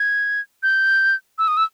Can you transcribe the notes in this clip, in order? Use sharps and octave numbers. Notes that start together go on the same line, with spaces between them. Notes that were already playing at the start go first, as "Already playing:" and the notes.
Already playing: G#6
G6
E6
D#6
E6